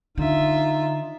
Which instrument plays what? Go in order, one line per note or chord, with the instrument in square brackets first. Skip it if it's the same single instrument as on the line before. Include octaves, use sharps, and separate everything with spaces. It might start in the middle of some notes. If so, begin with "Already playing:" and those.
[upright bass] D3 [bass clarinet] D#4 [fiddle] F4 E5